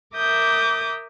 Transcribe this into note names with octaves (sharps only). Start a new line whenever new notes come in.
A#4 E5 D6 D#6 G6